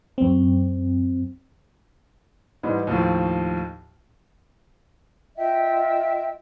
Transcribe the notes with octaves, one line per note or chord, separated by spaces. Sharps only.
F#2 C4
G#2 E3 G3 D#4
D#2 A2 D#3 F3
F4 D#5 E5 G5